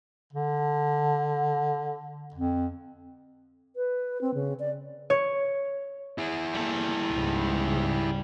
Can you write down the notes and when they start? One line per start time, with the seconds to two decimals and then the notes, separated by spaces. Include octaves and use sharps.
0.33 D3
2.34 F2
3.76 B4
4.21 C4
4.34 C#3
4.60 D5
5.10 C#5
6.18 E4 G#4
6.55 G3 A#3 A4
7.10 C#2 G#2 C#3